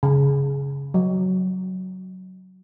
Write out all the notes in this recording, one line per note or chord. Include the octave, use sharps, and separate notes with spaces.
C#3
F#3